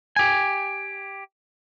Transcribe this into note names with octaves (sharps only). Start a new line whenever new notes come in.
G4 G#5